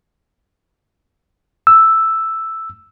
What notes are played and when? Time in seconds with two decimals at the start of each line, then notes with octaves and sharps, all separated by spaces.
1.67 E6